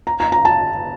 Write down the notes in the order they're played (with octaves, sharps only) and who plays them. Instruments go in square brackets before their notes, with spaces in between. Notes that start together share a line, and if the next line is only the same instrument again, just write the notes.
[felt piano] A#5
A#5
A#5
A5